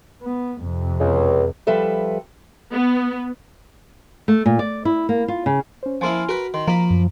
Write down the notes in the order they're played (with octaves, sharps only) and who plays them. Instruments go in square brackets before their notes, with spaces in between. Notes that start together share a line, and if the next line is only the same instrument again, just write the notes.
[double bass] B3
F2 C3
[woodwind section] C#2
[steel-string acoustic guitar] F3 G3 A4 B4 E5
[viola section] B3
[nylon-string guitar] A3
A#2
D5
E4
A#3
F4
C#3
[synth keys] C#4 C5
[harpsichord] F3 A#3 E4 [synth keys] G#5 C6 F6
[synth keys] F#4 [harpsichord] A#4 B4
[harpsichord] D#3 [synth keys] C6
[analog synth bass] F3 [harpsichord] A#3 B5 [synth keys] A#5
[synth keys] F#2